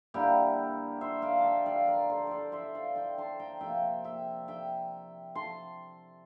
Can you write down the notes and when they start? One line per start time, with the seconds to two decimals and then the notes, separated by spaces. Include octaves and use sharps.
0.14 D3 G3 A#3 E4 G4
1.01 C5 E5
1.22 D5 F5
1.39 A5
1.44 E5 G5
1.66 D5 F5
1.87 A#4 D5
2.10 A4 C5
2.27 A4 C5 D5
2.52 C5 E5
2.75 D5 F5
2.95 E5 G5
3.18 A5 C6
3.40 G5 A#5
3.61 C3 F3 A#3 E5 G5
4.04 E5 G5
4.48 E5 G5
5.35 A5 C6